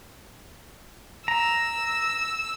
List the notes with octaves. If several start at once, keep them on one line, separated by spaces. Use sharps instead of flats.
A#5 E6